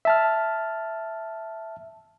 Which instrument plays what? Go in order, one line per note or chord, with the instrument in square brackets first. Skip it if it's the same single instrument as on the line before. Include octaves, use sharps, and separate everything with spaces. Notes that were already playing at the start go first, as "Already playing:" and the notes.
[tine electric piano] E5 A5 F6